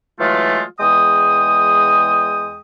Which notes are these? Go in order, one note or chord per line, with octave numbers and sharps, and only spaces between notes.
E3 F#3 G#3 A3 F4
E2 G#3 G5 D#6